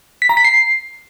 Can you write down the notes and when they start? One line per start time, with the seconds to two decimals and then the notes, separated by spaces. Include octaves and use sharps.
0.22 B6
0.29 A#5
0.37 B6
0.45 C7